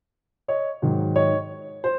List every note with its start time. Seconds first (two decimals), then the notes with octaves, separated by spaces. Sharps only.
0.48 C#5 D#5
0.82 G#2 D#3 F#3
1.16 C#5 D#5
1.84 C5